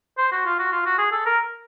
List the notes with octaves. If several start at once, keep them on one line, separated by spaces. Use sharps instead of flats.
C5
F#4
F4
F#4
F4
F#4
G#4
A4
A#4